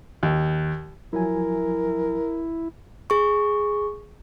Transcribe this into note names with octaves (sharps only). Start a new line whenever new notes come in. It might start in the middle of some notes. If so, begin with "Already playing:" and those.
D#2
F3 F#3 E4 A#4 G#5
G#4 C#6